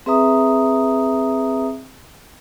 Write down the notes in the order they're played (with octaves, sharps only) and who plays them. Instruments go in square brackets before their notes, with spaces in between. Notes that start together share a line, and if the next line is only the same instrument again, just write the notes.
[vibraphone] C4 G#4 B4 E5 A#5 D#6